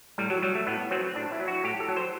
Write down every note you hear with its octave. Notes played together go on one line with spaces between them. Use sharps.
A2 G3
F#3
F#3 G3
A3
A2 B3
F#3 C4
A2 D4
E4
F#3
F#4
A2 G4
A4
F#3
C5